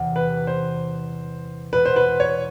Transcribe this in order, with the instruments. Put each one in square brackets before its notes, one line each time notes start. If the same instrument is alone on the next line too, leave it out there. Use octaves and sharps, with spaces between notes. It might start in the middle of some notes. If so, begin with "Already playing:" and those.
Already playing: [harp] E2 C3 E3
[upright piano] B4
C5
[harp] E2 B2 G#3 [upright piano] B4
[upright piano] C5
B4
C#5